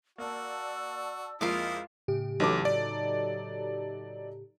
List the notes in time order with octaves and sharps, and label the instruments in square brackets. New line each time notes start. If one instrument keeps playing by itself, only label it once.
[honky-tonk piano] A#3 [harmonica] F#4 [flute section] D5 A5 E6
[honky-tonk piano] F2 G#3 A#3 [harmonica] E4 D#5 [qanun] F4 F5 D6
[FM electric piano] A2 C#3 G4
[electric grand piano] A1 D6 [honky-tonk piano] F#3 D#4 A4
[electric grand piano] D5